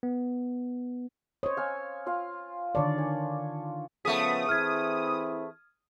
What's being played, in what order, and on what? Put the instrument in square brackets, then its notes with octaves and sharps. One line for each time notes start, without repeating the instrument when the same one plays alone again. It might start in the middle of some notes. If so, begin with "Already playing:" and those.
[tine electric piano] B3
[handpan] C5 C#5 [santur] D#5
[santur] F5 G#5 E6
F4 F5
[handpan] D3 D#3 D5 [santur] D4 C#5
[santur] G#5
[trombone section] C#3 F3 B3 [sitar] A3 G#4 [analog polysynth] D#6 [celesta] B6
[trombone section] E3 C4 E4 [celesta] F6 G#6